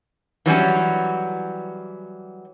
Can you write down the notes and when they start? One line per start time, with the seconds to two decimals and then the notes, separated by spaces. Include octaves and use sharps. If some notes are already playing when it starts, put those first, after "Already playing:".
0.46 E3 F#3 G3 C#4